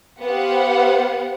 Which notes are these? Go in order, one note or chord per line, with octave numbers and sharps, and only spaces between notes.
B3 G4 C5 F5 F#5